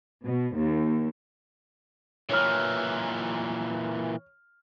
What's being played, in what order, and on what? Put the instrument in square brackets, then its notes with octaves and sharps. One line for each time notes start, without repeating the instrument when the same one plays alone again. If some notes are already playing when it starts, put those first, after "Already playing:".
[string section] B2
D#2
[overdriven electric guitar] A#2 E3 [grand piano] C#5 F6